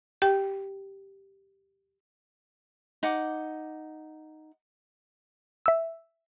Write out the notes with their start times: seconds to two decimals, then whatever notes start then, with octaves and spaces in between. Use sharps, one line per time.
0.22 G4 G5
3.03 D#4 F#5 D6
5.66 E5 E6